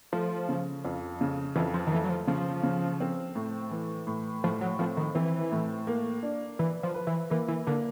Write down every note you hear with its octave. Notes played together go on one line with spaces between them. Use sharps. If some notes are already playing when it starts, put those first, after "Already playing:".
F3 A3
C#3
F2
C#3
F2 E3
F3
D#3
E3 A3
F#3
F3
C#3 F3
C#3
C4
A2
E3
A2
A2 F3
F#3
F3 C4
D#3
E3 C4
A2
A#3
D4
E3 B4
F3
B4
E3
E3 A#3
E3
D3 A#3